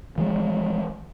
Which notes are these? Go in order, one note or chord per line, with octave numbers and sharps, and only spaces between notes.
E3 F3 G#3